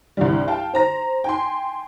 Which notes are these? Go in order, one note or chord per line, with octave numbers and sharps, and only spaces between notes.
C2 G2 E3 G3
F5 G5 A5
C5 A#5 A#6
G5 G#5 C6